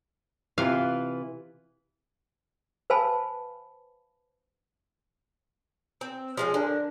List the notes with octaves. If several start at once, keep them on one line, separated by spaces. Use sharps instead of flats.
C3 E3 F4 F5
B4 C5 F5 G#5 A5 B5
C4
F3 G#3 C#4
D3 D4 A#4